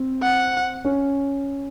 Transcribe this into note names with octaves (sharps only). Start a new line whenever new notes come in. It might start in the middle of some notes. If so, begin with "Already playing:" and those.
Already playing: C4
F#5
C#4